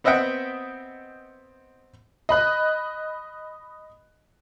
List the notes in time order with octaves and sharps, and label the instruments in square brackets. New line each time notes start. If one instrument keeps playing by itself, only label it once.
[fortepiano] B3 C4 D#5 E5 F#5 G5
[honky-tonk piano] D#5 B5 F#6